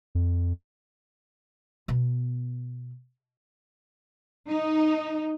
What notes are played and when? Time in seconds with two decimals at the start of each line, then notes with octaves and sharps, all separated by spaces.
0.15 F2
1.88 B2 B3
4.48 D#4